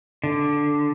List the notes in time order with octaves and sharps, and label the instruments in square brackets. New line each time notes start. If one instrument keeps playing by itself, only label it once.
[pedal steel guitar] D3